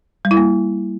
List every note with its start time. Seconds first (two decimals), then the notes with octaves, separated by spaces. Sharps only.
0.25 G3
0.31 E4
0.37 A#3